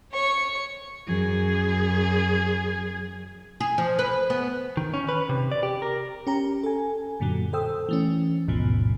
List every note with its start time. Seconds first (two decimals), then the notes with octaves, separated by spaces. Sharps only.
0.13 C#5 C#6
1.07 F#2 G#4
3.60 G#4
3.78 F3
3.99 B4
4.30 B3
4.77 D#3
4.94 C#4
5.09 B4
5.29 C3
5.52 D5
5.63 G4
5.82 A#4
6.27 C#4 G4 A#5
6.63 A4 G#5
7.20 F#2 A#2 D3 F#3
7.53 A4 C5 G5 D#6 E6
7.89 E3 A3 C#4
8.48 A1 D#2 G#2 B2 F3